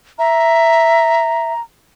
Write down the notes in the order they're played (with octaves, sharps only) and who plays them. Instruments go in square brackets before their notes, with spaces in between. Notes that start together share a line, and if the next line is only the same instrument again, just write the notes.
[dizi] E5 [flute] A#5